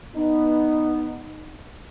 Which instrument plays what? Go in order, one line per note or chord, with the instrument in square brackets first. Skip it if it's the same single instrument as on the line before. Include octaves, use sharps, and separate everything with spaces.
[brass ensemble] B3 D#4